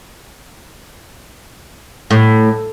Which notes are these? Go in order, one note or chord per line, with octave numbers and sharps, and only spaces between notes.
A2